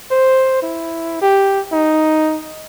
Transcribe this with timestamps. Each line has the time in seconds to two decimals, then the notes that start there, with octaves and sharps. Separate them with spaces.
0.11 C5
0.63 E4
1.22 G4
1.72 D#4